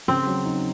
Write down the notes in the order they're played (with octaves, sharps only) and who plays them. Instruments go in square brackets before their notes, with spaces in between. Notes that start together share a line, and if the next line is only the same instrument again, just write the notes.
[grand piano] C#3 [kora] C4
[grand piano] F#3
D#4